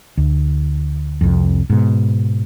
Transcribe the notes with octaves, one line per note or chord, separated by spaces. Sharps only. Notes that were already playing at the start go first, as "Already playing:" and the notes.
D2
C2 F2
G#2 B2